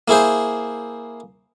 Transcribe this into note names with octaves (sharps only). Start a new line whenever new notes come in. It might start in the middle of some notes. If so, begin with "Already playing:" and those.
A#3 E4 G#4 C5